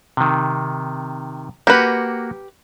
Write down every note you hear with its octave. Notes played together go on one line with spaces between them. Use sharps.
C3 D#3
A#3 F#4 G4 B4 F#5